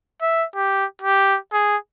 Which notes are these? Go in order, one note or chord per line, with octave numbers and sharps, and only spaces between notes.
E5
G4
G4
G#4